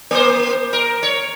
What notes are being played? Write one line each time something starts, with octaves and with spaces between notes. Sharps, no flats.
A#3 C5
A#4
C#5